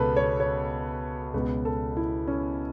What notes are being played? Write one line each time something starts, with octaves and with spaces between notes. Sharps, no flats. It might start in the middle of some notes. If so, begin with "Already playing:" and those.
Already playing: C#2 B2 A4 B4
C#5
C#5
C#2 B2 B4
A4
E4
C#4